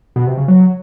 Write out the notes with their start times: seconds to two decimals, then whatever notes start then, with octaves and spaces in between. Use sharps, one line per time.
0.16 B2
0.27 C3
0.37 C#3
0.48 F#3